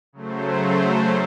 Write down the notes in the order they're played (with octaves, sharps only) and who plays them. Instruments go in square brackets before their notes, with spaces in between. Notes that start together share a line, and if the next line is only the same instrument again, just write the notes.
[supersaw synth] C#3 F#3 A3 C5